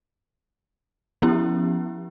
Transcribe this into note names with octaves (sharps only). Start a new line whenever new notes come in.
F3 B3 C#4 E4 G4